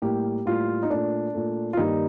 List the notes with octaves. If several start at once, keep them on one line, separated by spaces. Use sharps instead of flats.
A2 G3 A#3 G4
A2 G3 A#3 F4
D#4
A#2 A3 D4
A#2 A3
F4
G2 D#3 G3 A#3 D#4